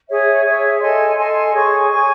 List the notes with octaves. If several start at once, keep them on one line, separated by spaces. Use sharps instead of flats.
G#4 C#5 E5
G#4 C#5 E5
A4 D#5 G#5 C6
A4 D#5 G#5 C6
G#4 C#5 G#5 C#6
G#4 C#5 G#5 C#6